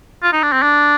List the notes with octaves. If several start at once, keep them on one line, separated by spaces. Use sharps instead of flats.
F4
D#4
D4
C4
D4